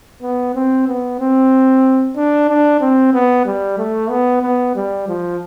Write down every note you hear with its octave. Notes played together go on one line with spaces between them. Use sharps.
B3
C4
B3
C4
D4
D4
C4
B3
G3
A3
B3
B3
G3
F3